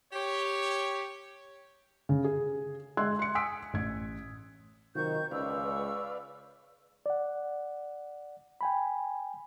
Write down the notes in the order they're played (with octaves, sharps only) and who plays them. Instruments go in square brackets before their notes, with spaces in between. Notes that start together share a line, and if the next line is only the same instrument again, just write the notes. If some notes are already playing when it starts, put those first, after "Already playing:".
[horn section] G4 C#5
[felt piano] C#3
G#4
G#3 C6 E6 F#6 G#6
C6 C#7
G#5 D#6 E6 B6 D7
A1 G#6
[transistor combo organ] C3 F#3 F4 [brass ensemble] D#3 [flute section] C5 C#6 G6
[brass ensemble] C#2 [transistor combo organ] B4 D5 F5 [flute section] C#6 E6
[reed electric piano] D5 F#5
G5 G#5 B5